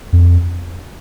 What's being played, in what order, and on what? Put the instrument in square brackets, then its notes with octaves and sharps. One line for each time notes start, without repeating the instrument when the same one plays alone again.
[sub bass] F2